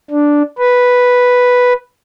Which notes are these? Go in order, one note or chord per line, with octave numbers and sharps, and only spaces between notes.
D4
B4